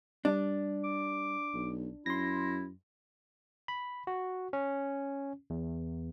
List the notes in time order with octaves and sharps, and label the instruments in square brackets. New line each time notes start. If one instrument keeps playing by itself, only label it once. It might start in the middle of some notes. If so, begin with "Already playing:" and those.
[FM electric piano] G3 [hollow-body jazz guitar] D4
[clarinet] D6
[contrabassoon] B1
[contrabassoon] F#2 [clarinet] E4 [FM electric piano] C6 A#6
[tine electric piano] B5
F#4
C#4
E2